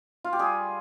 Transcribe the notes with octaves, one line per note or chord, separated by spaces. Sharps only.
F4
G4
G3 G#4